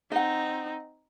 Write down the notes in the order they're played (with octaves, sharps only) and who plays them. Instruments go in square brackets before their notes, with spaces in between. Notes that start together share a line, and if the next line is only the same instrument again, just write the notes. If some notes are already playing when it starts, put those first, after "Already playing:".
[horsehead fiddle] C4 D#4 [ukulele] D#5 F#5